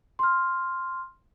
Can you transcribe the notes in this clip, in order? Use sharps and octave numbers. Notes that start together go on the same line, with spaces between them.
C6 F6